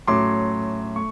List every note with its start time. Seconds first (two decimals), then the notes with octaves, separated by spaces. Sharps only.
0.07 A2 F#3 A3 C#4 C6 D6
0.96 A3 C#6